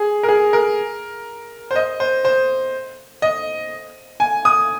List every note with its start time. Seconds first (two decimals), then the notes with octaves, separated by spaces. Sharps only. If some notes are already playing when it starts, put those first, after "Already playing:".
Already playing: G#4
0.23 A#4
0.28 G#4
0.53 A#4
1.71 C5
1.76 D#5
2.00 C5
2.25 C5
3.22 D#5
4.20 G#5
4.45 D#6